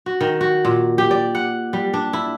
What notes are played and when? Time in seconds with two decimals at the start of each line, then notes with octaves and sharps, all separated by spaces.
0.06 F#4
0.21 D#3
0.41 F#4
0.65 A#2
0.98 G4
1.11 D5
1.35 F#5
1.73 G3
1.94 D4
2.13 E4